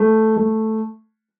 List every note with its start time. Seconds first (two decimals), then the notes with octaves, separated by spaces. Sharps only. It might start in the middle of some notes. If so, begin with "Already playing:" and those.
Already playing: A3
0.37 A3